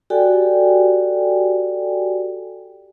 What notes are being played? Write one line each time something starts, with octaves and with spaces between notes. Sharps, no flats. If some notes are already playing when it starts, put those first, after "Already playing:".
F#4 G4 A4 D5 G5 G#5